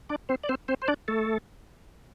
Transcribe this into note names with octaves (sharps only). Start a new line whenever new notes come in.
D4 D5
C4 C5
D5
C4 C5
C4 C5
C5
D4 D5
A3 A4